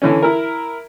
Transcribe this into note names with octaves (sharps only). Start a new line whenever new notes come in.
D3 E3 C#4
E4 A#4